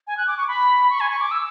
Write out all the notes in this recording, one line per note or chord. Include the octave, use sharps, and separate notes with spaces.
G#5
F#6
D6
C#6
B5
C#6
G#5
C#6
D6
E6